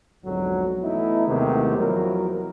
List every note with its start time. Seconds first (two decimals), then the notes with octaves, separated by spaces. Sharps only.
0.25 B1 F2 G#2 D3 F#3
0.82 E3 A3 B3 D#4 E4
1.27 D#2 C3 D#3 G#3 A3 B3
1.78 E2 F3 F#3 E4 A#4